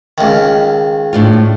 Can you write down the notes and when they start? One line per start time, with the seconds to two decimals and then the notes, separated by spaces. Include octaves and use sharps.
0.18 C#2 D#3
1.13 A2 D4 F4